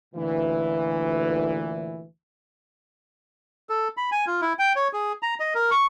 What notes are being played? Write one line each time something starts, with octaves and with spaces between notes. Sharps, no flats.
D2 A#2 E3
A4
B5
G#5
F4
E4
G5
C#5
G#4
A#5
D#5
A#4
C#6